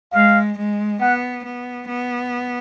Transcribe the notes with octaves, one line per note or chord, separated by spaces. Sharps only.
G#3 F5
G#3
B3 F#5
B3
B3